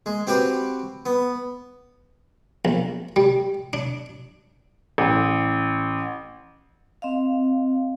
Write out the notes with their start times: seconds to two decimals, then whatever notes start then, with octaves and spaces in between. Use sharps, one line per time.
0.06 G#3
0.27 C4 F#4 G4 B4
1.06 B3
2.65 A#1
3.16 G3
3.73 D4
4.98 A1
7.02 C4 D#5 F5